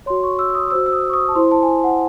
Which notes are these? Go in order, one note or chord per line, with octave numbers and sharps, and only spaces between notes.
F#4 C#5 C6
C#6
E6
E6
D#6
F#4 C5 E6
E6
D#6
C#6
D#6
A5
E4 C5 C6
A5
G#5
A5
F#5